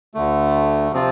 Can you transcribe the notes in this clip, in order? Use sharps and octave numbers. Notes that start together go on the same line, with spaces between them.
D2 D3 A3
C3 F3 C4 F4